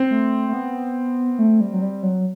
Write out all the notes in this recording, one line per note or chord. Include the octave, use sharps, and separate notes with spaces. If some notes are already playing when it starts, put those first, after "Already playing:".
Already playing: C4
A3
A3
B3
A3
G3
F#3
G3
F#3